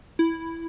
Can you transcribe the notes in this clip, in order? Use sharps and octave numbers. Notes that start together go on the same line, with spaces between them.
E4